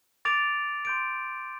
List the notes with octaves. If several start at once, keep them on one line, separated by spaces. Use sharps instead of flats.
D6 A6 D7 F7
C6 G6 D7